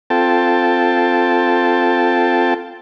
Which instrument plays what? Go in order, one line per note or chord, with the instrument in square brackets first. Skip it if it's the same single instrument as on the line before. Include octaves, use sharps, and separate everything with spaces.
[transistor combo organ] C4 F4 A4 G5 A5